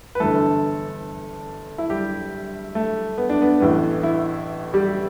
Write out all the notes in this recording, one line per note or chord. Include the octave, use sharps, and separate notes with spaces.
B4
G1 G2 E3 A3 A4
E4
G3 G4
A3
B3
D4
B3
A1 A2 E3 B3
E3 E4
G3 G4